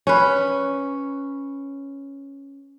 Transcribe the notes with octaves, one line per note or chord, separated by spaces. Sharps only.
C#4 B4